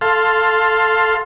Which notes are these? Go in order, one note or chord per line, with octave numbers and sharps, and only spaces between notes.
A4 F5 C6